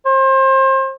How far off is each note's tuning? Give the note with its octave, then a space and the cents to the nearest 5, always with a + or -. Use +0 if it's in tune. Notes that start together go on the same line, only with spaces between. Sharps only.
C5 +30